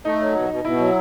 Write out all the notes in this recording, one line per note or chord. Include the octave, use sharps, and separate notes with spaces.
A3 D#4
F#3
B2
B2
B2 E4
F#3